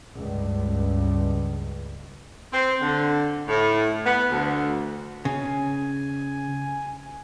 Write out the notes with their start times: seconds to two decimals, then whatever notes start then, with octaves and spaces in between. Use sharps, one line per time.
0.15 C#2 G2
2.53 C4
2.82 D3
3.48 A2
4.05 B3
4.31 D2
5.25 C#3 G#5